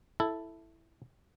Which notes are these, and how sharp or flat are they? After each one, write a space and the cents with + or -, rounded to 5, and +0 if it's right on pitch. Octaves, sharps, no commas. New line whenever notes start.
E4 +0 A4 +0